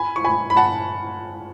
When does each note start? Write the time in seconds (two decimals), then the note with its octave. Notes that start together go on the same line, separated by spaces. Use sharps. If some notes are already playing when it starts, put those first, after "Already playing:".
Already playing: G#5 B5
0.16 C#6
0.25 G#5 B5
0.50 B5
0.56 F#5 A5